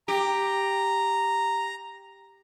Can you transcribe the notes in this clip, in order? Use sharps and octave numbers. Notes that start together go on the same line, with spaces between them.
G4 A#5